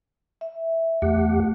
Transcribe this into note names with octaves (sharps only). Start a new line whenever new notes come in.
E5
E2 A3 G4 F#5